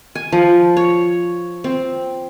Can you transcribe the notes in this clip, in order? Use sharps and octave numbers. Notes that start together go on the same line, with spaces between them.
G#5
F3
C#5
C4